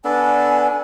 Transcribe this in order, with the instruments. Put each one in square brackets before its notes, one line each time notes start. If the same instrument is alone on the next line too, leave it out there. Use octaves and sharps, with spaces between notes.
[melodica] B3 D4 A4 [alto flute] G#5